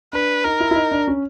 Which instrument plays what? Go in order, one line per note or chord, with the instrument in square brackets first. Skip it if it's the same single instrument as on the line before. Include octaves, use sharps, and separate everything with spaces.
[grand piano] D4 [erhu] B4
[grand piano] D#4 [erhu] A#4
[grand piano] E4
E4
D#4
D4
C#4